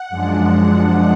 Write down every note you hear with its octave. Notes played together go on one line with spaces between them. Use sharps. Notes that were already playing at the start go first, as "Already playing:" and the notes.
Already playing: F#5
F#2 F3 G#3 D4